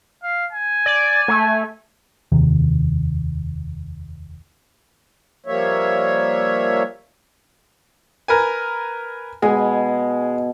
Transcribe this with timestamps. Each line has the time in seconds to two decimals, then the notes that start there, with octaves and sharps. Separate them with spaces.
0.23 F5
0.53 G#5
0.86 D5
1.28 A3
2.32 F1 D#2 C3 D#3
5.46 F3 G3 A#3 C#5 E5
8.28 A#4 B4 G#5
9.42 B2 G#3 G#5